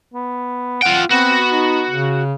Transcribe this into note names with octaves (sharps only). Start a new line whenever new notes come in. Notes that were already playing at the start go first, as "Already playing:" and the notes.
B3
F4 F#5 G5
B3 C4 F#4
D#4
C#3